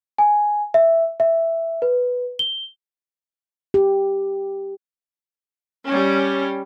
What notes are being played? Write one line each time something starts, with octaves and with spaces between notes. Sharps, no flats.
G#5
E5
E5
B4
G7
G4
G3 C#4